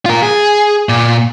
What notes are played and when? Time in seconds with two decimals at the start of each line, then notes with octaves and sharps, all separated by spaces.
0.06 F4 A#4
0.23 G#4
0.89 A#2